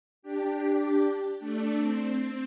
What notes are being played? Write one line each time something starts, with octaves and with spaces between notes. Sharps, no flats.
D4 G4
A3 D4
C4